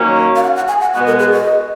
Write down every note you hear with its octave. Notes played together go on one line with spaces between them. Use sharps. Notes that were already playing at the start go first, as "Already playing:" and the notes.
Already playing: D#3 F#3 A#3 C#4
F5
F#5
F#5
G#5
F#5
B2 G#3 B3 F#4 F#5
A#4
G#4
D#5